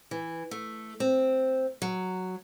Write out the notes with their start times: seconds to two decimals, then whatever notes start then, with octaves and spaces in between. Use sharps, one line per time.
0.11 E3
0.51 A3
1.00 C4
1.82 F#3